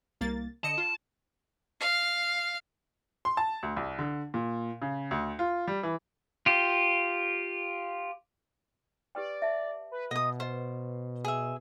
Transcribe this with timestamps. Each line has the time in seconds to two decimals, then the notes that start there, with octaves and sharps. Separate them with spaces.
0.21 C2 A#3 A6
0.64 D3 D#5 A5 C#7
0.78 F4
1.80 F5
3.25 C6
3.37 A5
3.63 D2
3.77 C2
3.99 D3
4.34 A#2
4.82 C#3
5.11 D2
5.39 F4
5.68 G3
5.83 E3
6.46 F4 G4
9.15 G4 B4 D5 G5
9.42 E5 A5
9.92 B4
10.11 B2 D#5 D#6
10.40 B4 C5 D#5
11.25 G#4 E5